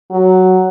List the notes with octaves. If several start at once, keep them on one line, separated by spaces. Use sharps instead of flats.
F#3